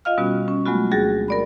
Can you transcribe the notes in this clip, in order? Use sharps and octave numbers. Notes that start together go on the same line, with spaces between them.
F4 D#5 F5 F6
B2 G3 B3 C#4 F#4
C#4
F#3 G#3 A3 B3 F4 F#4
D2 F#4 G#4 A6 A#6
A#4 D5 B5